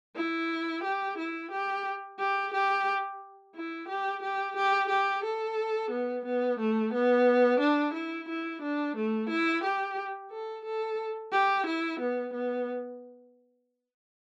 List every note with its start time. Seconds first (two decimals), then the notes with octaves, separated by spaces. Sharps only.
0.16 E4
0.84 G4
1.18 E4
1.51 G4
2.19 G4
2.53 G4
3.55 E4
3.88 G4
4.22 G4
4.56 G4
4.89 G4
5.24 A4
5.91 B3
6.25 B3
6.59 A3
6.93 B3
7.60 D4
7.94 E4
8.28 E4
8.62 D4
8.96 A3
9.29 E4
9.64 G4
10.31 A4
10.65 A4
11.32 G4
11.66 E4
12.00 B3
12.33 B3